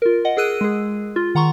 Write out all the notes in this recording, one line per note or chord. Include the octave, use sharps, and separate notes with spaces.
F4 A#4
D#5 F#5
G#4 A#4 E6 F#6 D#7
G#3 G#4
F4
D#3 F#5 A#5 C6 C#6